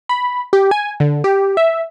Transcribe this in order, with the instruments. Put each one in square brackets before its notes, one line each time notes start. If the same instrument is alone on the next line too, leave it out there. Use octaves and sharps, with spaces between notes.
[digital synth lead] B5
G4
G#5
D3
G4
E5